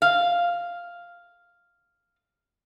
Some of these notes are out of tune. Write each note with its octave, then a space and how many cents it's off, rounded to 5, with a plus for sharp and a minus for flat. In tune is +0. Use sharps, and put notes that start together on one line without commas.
F5 +0